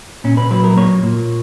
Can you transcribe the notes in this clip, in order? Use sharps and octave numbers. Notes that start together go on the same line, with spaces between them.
A#2 C#4
B4
F#3 B4
A#4
A#3 C#5
A#2